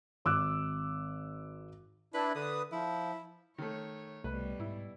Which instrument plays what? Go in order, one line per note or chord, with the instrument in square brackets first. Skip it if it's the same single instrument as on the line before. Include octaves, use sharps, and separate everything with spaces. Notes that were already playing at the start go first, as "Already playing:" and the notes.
[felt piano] G#1 D6 E6 F#6
[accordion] D4 E4 [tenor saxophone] B4
[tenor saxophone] D3 [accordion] B4 D#6
[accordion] F3 [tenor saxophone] E4
[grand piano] D#3 A3 [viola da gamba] C#5
[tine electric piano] C2 A3 [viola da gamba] B2 G3 [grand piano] B4
[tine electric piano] G#2 [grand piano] E4